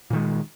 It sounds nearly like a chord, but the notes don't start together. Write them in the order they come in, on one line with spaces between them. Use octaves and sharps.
A#2 D#3 G#3